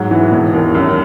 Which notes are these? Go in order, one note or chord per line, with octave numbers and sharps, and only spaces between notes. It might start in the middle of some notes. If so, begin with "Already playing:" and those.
Already playing: G#2 F#3
E3
E1
D#2
F#2